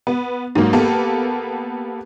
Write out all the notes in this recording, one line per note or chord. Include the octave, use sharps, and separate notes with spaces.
B3
G#2 F#3 A#3
A#3 B3 G4 A4